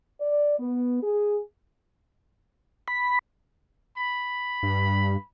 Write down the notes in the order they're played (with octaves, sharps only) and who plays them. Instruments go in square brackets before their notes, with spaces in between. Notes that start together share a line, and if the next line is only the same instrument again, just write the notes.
[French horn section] D5
B3
G#4
[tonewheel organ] B5
[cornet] B5
[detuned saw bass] G2